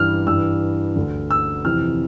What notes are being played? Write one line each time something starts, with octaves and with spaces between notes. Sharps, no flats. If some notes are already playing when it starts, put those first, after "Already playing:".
Already playing: G2 E3 F6
G2 E3 E6
D2 D3
E6
F2 C3 E3 F6